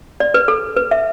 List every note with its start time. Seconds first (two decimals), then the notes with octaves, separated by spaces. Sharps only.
0.20 D5
0.34 B4
0.48 A4
0.76 B4
0.91 E5